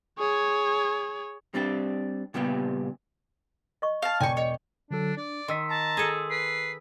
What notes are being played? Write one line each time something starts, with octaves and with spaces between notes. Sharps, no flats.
G#4 C#5
G3 C4 D4 G4
A#2 C#3 G3 B3 G4
D#5 C#6
F5 A5
E1 D5 G5 G#5 C#6 G6
C#5 D#5
D3 F#3 D4 A4
D4 D5
D#3 C6 E6 B6
A5 A#5
G#4 A4
B4 C7